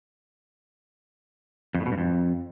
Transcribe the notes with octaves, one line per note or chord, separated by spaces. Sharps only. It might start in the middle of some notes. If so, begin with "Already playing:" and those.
F2
A2
B2
G2
F2